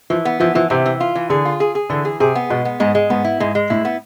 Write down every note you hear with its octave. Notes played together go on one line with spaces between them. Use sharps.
E3 F3
B3
E3 F3
E3 F3
C3 E3
E3
F4
E3
D3 G#4
F4
G#4
G#4
D3 E3
G#4
C3 G#4
B3
B2 G#3
B3
G#2 G#3
G#3
G#2 B3
E4
G#2 G#3
G#3
A2 E4
B3